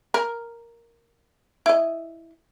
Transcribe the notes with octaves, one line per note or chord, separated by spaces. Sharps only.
A#4
E4 D#5